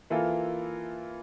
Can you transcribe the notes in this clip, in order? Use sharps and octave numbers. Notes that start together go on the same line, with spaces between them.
E3 A#3 F4 A4